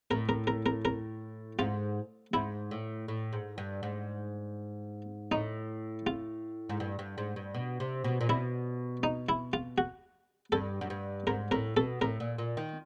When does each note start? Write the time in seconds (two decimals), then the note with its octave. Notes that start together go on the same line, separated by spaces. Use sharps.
0.11 A2 A#4
0.29 A#4
0.47 A#4
0.66 A#4
0.85 A#4
1.59 G#2 F4
2.34 G#2 E4
2.71 A2
3.08 A2
3.33 G#2
3.58 G2
3.83 G#2
5.32 A2 D#4
6.07 F4
6.69 G#2
6.80 G2
6.99 G2
7.18 G#2
7.36 G2
7.54 B2
7.80 C3
8.04 B2
8.21 A#2
8.29 B2 E4
9.03 D#4
9.29 E4
9.53 F4
9.78 F#4
10.52 G2 A4
10.81 F#2
10.90 G2
11.27 G#2 A#4
11.51 A2 A#4
11.76 B2 A4
12.01 A2 A#4
12.20 A#2
12.38 A#2
12.57 D#3